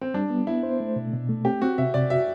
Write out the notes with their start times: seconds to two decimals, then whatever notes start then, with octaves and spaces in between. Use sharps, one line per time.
0.01 C4
0.14 G3 D4
0.30 B3
0.47 B3 E4
0.63 C5
0.80 A3
0.96 B2
1.13 B2
1.29 A3
1.45 C4 G4
1.62 C4 F#4
1.78 C3 E5
1.94 C3 D5
2.10 F#4 E5